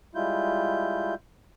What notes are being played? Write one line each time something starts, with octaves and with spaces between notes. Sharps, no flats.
G3 G#3 E4 F4 G6